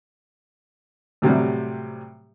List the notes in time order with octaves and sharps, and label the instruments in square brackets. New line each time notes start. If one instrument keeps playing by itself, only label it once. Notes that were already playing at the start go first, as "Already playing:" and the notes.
[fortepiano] A2 C3 F#3 G3